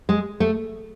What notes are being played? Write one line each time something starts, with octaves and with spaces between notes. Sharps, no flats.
G#3
A3